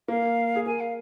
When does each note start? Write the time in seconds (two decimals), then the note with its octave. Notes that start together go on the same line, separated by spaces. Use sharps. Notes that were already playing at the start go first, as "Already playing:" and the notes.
0.08 A#3 F5
0.56 G#4
0.66 A#4 G#5
0.81 F5